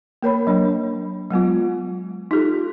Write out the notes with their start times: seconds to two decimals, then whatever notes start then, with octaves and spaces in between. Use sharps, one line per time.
0.23 A#3 A#4 C#5 B5
0.47 F#3 D4
1.30 F#3 G#3 B3 F4
2.31 D#4 F4 G4 A4